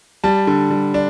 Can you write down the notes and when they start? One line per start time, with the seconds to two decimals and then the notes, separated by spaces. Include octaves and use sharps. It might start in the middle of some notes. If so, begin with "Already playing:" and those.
0.24 G3 A5
0.47 D3
0.71 G3
0.94 D4